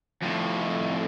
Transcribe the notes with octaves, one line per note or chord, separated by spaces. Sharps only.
F2 A2